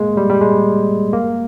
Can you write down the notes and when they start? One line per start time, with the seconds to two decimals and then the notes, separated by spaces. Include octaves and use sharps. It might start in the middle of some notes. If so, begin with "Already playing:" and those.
Already playing: G#3 A#3
0.17 G3
0.30 G3
0.41 G#3
1.13 A#3